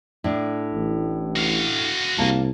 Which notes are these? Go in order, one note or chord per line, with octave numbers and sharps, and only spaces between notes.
A2 D4
A1
F#4 F5
C2 A#3 A5